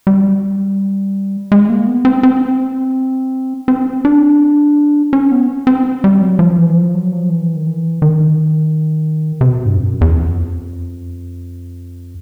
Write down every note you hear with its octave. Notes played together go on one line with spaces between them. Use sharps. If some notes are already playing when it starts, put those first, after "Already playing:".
G3
G#3
A#3
B3
C4
C4
C4
D4
C#4
B3
C4
G3
F#3
F3
E3
F3
F#3
F3
E3
D#3
E3
D#3
C3
B2
G2
F2
F#2
E2
F2